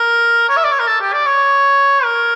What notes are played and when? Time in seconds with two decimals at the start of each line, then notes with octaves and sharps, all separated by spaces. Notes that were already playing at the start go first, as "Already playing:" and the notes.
Already playing: A#4
0.49 C#5
0.56 E5
0.64 D5
0.71 C#5
0.79 A#4
0.87 A4
1.00 G4
1.13 D5
1.26 C#5
2.04 A#4